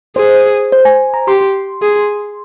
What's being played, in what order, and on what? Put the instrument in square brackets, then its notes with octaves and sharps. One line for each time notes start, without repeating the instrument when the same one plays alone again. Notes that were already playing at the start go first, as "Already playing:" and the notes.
[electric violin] G#4 [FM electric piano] C5
[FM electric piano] C5
G#5
A#5
[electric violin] G4 [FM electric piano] C6
[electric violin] G#4